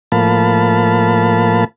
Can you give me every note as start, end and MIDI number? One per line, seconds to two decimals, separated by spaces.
0.12 1.64 45
0.12 1.64 53
0.12 1.64 58
0.12 1.64 77
0.12 1.64 81
0.12 1.64 83